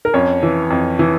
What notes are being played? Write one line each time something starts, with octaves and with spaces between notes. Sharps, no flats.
A#4
F2 C#4 C#5
E3
F2
E3